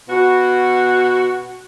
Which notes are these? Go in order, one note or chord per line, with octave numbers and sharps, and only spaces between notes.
B2 F#4